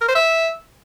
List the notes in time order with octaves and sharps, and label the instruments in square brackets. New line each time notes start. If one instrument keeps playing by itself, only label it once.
[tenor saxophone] A#4
C5
E5